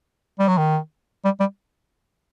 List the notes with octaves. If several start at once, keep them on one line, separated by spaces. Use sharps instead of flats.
G3
F#3
D#3
G3
G3